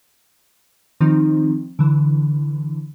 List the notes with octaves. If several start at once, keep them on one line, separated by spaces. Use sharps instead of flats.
D#3 F3 C4 D#4
D3 E3